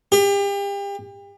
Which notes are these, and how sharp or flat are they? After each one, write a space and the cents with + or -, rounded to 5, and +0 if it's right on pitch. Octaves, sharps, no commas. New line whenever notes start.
G4 +35